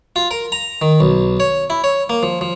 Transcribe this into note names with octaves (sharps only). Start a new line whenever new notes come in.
F4
A#4
A#5
D#3
B1
C#5
E4
C#5
A#3
F3
F3